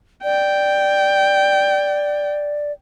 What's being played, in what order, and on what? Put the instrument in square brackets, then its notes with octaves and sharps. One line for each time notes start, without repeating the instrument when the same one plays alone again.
[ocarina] D5 [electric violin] G5